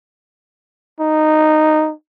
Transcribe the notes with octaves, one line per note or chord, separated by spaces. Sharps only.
D#4